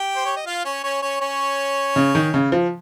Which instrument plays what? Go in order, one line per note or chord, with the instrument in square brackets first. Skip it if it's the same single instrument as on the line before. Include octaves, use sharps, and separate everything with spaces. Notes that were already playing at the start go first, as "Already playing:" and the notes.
Already playing: [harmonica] G4 G5
C5
C#5
D#5
F4 F5
C#4 C#5
C#4 C#5
C#4 C#5
C#4 C#5
[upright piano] C#3
D#3
C#3
F3